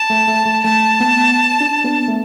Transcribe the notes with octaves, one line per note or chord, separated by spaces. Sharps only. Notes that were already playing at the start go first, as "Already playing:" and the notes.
Already playing: A5
A3
A3
A3
A3 A5
B3
D4
B3
A3